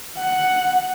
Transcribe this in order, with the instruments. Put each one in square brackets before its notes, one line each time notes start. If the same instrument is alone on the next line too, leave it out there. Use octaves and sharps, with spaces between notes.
[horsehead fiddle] F#5